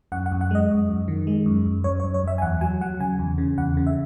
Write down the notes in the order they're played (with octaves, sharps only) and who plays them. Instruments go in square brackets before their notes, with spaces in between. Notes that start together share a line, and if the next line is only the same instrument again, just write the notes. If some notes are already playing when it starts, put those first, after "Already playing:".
[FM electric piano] F#2 F#5
F#5
F#2
F#5
G#3 D#5
F#2
F#2
D#3
G#3
F#2
F#2
F#2 C#5
C#5
F#2
C#5
F#2 E5
G#5
E2 F#5
F#3 G#5
F#3 F#5
C#3 G#5
E2
C#3
E2 F#5
C#3
E5